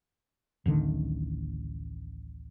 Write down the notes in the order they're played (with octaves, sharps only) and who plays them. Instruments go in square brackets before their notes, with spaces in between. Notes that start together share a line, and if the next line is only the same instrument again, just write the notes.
[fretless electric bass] D1 A1 D3 D#3